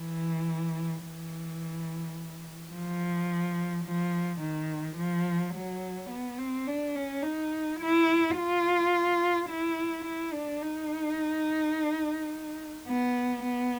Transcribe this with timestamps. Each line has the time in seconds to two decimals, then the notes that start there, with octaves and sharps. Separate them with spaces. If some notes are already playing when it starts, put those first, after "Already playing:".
Already playing: E3
1.03 E3
2.72 F3
3.85 F3
4.41 D#3
4.97 F3
5.54 F#3
6.10 B3
6.38 C4
6.67 D4
6.95 C#4
7.23 D#4
7.80 E4
8.37 F4
9.50 E4
10.06 E4
10.33 D4
10.62 D#4
12.88 B3
13.44 B3